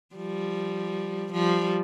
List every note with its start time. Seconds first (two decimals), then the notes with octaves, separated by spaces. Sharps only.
0.16 F3 G3
1.32 F3 G3